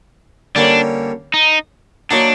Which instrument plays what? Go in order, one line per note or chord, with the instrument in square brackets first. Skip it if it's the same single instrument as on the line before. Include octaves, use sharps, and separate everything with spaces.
[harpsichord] D3 G3 A#3 C#4 [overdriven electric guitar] D4
[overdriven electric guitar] D#4
[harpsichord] F#3 A#3 D#4 F#4 A#4 [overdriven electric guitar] D4